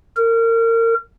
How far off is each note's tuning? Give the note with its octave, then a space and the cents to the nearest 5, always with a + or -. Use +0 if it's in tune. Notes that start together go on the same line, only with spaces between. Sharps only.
A#4 -30